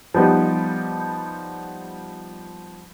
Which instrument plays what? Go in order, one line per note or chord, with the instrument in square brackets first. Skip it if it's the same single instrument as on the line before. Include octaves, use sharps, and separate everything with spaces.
[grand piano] F3 G3 B3 D#4 G4